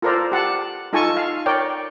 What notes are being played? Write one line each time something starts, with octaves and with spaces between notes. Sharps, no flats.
F4 A4 A#4 C5 D5
G4 F#5 A5
D#4 F4 A4 G#5 A5 C#6
F5
A#4 C#5 D5 G5